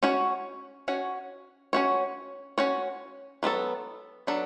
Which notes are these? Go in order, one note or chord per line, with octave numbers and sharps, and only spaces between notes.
C#4 F#4 C#5
C#4 F#4 C#5
C#4 F#4 C#5
C#4 F#4 C#5
F#3 B3 D4 A4
F#3 B3 D4 A4